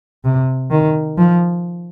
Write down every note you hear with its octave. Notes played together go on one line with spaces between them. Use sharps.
C3
D#3
F3